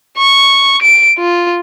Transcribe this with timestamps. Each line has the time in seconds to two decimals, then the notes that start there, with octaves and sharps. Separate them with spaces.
0.18 C#6
0.82 D7
1.18 F4